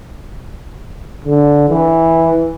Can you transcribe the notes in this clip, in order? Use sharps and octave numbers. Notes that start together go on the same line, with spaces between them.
D3
E3